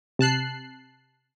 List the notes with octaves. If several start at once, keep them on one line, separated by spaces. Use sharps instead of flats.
C3 A5 F#6 C7